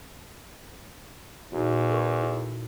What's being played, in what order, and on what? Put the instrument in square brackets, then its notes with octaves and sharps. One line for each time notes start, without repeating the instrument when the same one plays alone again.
[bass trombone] E2 [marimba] A#2 D#4 F#4
[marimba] A4 A#4 C#6
E4